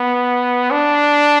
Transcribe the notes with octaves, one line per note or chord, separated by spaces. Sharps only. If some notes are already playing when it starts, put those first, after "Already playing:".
Already playing: B3
D4